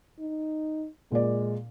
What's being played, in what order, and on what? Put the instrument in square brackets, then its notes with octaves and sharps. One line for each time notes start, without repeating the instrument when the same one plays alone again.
[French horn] D#4
[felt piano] A#2 D5 [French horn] G#3